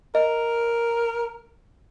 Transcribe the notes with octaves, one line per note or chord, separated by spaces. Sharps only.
A#4 D#5